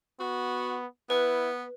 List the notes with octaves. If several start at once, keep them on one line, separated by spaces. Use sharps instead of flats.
B3 F#4
B3 E4 B4